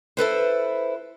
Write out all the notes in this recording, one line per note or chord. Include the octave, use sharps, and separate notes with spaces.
E4 A4 B4 C5